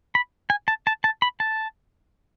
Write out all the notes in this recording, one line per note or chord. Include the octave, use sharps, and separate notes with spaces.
B5
G#5
A5
A5
A5
B5
A5